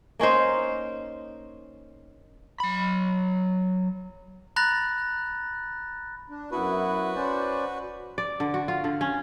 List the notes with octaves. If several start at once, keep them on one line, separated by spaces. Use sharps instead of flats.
A#3 C#4 D#4 C5
F#3 B5
A#5 B5 F#6 A6 A#6
D4
F#2 B3 E4 F#4 B4
C#4 C5 D5
D5
D3
F#4
F4
D3
C#4